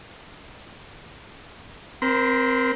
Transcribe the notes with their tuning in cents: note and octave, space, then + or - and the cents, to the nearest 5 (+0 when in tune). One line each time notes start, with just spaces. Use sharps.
C4 +0 A#4 +25 C6 -40